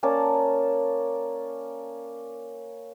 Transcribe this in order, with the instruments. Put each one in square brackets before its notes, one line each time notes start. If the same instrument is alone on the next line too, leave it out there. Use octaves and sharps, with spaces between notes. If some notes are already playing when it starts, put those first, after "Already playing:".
[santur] A#3 C#4 D5 A5